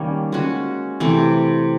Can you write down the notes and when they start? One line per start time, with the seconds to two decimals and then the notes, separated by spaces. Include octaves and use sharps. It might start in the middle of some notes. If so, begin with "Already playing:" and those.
Already playing: D#3 G3 A#3 C#4
0.32 G#3 C#4 F#4
1.00 C3 E3 A3